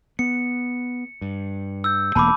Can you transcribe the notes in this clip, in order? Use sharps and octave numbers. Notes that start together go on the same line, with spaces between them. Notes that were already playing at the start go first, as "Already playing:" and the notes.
B3 C#7
G2
E6 G6
E1 A#3 A5 B5 D6